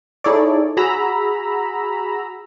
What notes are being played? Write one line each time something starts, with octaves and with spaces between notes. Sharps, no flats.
D#4 E4 G#4 A4 C#5 D5
F#4 G#4 A#5 B5 E6